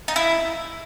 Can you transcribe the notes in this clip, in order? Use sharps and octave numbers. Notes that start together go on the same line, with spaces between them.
D#4
E4